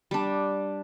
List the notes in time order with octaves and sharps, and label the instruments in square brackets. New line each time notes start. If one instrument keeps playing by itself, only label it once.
[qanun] G3 D4